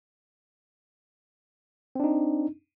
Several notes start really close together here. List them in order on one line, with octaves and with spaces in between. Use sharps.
C4 D4 D#4